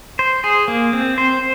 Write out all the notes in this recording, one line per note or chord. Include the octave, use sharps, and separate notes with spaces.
C5
G#4
A#3
C4
C5